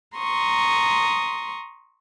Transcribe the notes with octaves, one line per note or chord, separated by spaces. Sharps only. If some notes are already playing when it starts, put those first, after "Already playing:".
A#5 C6 C#6 D#6